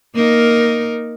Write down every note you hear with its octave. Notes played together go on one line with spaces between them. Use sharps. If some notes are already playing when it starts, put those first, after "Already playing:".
A#3 D#4 A#4